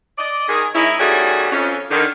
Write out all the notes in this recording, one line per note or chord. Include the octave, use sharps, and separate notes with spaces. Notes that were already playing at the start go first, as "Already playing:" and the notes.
D5 D#5
D#3 G#4
G#3 C#4 D#4 E4
D#3 G3 A3 C#4 F#4 G#4
F2 C#4
D3 D#3